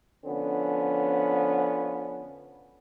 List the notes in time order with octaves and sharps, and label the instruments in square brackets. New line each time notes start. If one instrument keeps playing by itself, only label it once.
[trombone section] D3 F3 B3 C#4